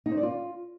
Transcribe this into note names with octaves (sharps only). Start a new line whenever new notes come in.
D#4
C5
D5
F4